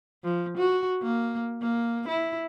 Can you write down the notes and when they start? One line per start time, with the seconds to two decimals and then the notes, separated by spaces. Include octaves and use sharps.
0.24 F3
0.58 F#4
1.02 A#3
1.61 A#3
2.08 E4